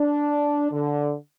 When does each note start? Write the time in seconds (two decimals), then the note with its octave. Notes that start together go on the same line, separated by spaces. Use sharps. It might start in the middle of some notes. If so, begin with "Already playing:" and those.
Already playing: D4
0.71 D3